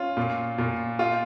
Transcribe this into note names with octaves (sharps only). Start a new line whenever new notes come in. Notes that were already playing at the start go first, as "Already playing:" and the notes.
Already playing: C#4 F4
A#2
A#2
F4